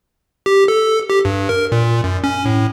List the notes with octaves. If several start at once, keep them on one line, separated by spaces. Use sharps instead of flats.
G4
A4
G4
G2
A#4
A#2
F#2
C#4
A2